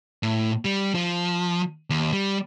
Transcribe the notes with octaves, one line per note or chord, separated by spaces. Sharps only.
A2
G3
F3
D#2
G3